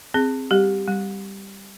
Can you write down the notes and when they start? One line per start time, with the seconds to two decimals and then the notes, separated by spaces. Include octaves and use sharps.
0.14 C4 G#4
0.51 G3 G4
0.87 G3